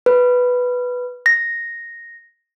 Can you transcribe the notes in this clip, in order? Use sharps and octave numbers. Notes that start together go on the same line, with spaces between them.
B4
A#6